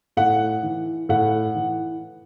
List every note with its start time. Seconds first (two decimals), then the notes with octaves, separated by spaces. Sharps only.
0.17 A2 F#5
0.63 E3
1.09 A2 F#5
1.55 E3